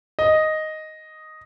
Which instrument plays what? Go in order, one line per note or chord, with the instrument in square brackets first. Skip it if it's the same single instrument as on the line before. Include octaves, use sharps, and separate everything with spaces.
[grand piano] D#5